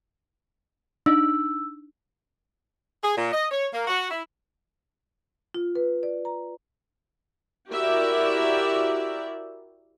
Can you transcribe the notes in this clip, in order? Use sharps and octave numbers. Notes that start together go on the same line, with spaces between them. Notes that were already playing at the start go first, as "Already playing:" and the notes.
D4 D#4 E6
G#4
A#2
D#5
C#5
A#3
F#4
E4
F4
B4
D5
A#5
E4 F#4 G4 A#4 D5 E5